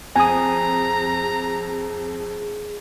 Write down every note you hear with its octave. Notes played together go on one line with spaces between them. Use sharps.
F2 G#4 G#5 A#5 D#6